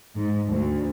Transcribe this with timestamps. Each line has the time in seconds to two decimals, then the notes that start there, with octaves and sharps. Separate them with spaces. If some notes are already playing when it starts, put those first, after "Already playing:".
0.15 G#2
0.48 D2